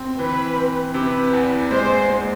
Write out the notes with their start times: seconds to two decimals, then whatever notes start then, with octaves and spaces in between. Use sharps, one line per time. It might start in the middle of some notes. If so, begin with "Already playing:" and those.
Already playing: C4
0.18 E3 B4
0.56 C4
0.94 C3 B4
1.33 E2
1.71 G#3 C5
2.09 G#3